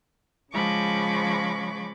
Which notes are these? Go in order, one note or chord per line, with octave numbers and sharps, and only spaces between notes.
C#3 F3 G#3 B5 C#6 D6